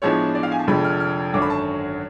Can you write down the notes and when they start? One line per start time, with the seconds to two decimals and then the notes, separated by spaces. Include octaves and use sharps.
0.02 A2 F3 G#3 B3 D4 C#5
0.35 D5
0.43 F5
0.52 G#5
0.59 A5
0.68 F1 F2 D3 G#3 B5
0.85 F6
1.00 F6
1.33 G#1 F#2 D3 F#3 D6
1.42 B5
1.50 A5